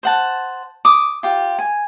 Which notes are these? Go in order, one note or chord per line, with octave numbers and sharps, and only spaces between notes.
C5 F#5 A5
D6 D#6
F4 G4
G#5